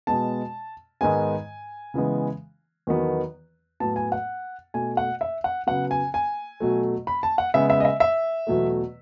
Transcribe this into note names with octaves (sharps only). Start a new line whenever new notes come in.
B2 G#3 B3 A5
G#2 D#3 G#3 B3 G#5
C#3 E3 G#3 B3
E2 D#3 F#3 B3
A2 F#3 B3 A5
G#5
F#5
B2 A3 G#5
F#5
E5
F#5
C#3 F#3 B3 F#5
G#5
G#5
B2 F#3 A3
B5
A5
F#5
C#3 G#3 B3 E5
E5
D#5
E5
E5
E2 B2 F#3 A3